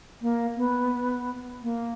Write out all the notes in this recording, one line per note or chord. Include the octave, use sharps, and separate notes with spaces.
A#3
B3
A#3